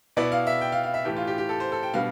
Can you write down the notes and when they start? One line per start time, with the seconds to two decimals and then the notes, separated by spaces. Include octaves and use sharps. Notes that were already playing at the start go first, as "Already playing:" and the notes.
0.17 B2 B3 E4 D5
0.32 F5
0.47 E5
0.61 G5
0.72 F5
0.83 F5
0.94 E5
1.05 A2 E3 A3 G4
1.16 F4
1.27 G4
1.38 G4
1.49 A4
1.60 C5
1.72 A4
1.83 G5
1.94 B2 G3 B3 D4 F5